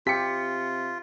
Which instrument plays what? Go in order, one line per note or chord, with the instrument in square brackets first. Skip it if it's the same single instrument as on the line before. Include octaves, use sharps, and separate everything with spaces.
[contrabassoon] C3 [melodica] F4 [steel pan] G4 [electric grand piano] B6 C#7